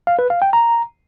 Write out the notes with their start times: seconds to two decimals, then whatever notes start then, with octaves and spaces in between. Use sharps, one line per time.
0.07 F5
0.19 B4
0.30 F5
0.42 G5
0.53 A#5